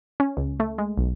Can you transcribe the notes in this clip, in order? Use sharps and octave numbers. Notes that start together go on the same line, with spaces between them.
C#4
C#2
A3
G#3
B1